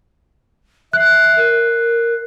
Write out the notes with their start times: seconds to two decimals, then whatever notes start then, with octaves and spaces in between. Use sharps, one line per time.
0.93 E5 F#6 C7
1.37 A#4